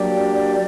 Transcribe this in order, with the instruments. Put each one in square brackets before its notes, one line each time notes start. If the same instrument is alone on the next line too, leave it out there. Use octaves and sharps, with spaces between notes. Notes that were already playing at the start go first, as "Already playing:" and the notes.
Already playing: [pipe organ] F#3 A#3 D4 G4 [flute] D5